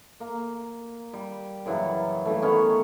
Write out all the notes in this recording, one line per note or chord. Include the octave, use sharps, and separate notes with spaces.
A#3
G3
F#2 C#3 E3 F#3
C#3 E3 G3 A3
D#3 B3 C#4 C#5